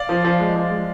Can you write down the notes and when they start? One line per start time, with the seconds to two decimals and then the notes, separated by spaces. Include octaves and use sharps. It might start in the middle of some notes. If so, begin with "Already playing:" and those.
Already playing: D5 F5
0.09 F3
0.25 F3
0.40 G#3
0.56 F3
0.71 G#3